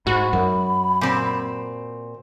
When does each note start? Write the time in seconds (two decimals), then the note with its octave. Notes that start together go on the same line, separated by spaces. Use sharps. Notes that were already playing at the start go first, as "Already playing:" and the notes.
0.07 G#2 F#4 B5
0.33 F#2
1.01 A#2 C4